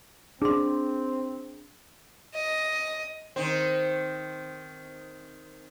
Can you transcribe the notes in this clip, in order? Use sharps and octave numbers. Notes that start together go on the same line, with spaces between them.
C4 D4 G#4 C6
D#5
D#3 C4